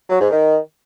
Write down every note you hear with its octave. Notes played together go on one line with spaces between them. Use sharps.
F#3
G#2
D#3